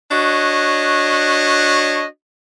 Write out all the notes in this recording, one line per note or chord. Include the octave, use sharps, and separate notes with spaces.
D4 F#4 C#5 D#5